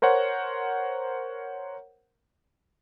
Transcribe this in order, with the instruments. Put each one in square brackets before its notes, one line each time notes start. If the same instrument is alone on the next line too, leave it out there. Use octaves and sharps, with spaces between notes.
[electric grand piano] A#4 C5 C#5 F#5